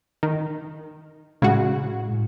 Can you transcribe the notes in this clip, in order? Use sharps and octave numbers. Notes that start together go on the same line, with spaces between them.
D#3
A2 C#3 G#3 F#4